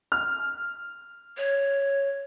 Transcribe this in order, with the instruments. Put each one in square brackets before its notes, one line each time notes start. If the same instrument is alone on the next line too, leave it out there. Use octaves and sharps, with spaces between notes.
[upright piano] F6
[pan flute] C#5